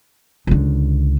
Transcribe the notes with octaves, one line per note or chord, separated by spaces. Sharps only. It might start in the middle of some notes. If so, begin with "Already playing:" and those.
C#2 D3